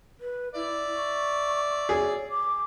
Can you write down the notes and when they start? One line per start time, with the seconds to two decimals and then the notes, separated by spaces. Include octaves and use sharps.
0.20 B4
0.55 E4 D5 E5
0.96 C#6
1.89 G#4 C#5
2.30 D6